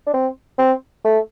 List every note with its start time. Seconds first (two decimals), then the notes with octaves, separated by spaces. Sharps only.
0.06 D4
0.14 C4
0.58 C4
1.05 A3